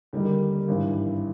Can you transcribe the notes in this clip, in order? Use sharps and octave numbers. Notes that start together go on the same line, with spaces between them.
D#2 D3 G3 A#3 D#4
G#1 G2 E3